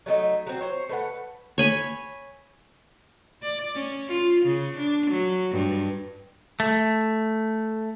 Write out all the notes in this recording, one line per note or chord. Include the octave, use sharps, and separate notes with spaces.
F#3 A3 A#3 D#4
F#3 C4
C5 C#5
A3 B4 C5 F#5
C#5 G#5 B5
D5
C#4
F4
C#3
D4
F#3
G2
A3